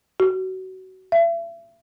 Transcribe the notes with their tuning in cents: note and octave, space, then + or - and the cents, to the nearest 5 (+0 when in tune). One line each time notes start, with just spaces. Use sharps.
F#4 +25
E5 +35